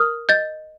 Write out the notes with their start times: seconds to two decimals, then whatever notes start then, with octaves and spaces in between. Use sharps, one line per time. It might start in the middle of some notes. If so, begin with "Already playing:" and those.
Already playing: A#4 D#6 F6
0.29 D#5 G6 A6